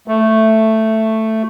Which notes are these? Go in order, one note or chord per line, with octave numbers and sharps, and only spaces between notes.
A3